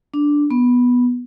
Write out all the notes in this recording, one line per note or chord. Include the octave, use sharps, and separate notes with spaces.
D4
B3